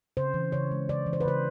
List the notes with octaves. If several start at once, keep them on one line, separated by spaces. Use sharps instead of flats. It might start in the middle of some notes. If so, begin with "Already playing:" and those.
C#3 C5
E3
C#3 C#5
G#3
C#3 D5
E3
C5
B4
C#3 C5